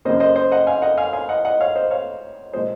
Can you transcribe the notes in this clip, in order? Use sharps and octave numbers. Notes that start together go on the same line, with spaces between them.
F#2 C#3 F#3 A#3 C5 D#5
C5 D#5
C5 D#5
D#5 F#5
F5 G#5
D#5 F#5
F5 G#5
F5 G#5
D#5 F#5
D#5 F#5
C#5 F5
C5 D#5
C#5 F5
A#2 F3 G#3 C5 D#5